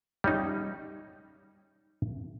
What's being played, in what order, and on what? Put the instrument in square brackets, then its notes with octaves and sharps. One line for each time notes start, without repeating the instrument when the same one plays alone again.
[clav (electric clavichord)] G3 C#4 D#4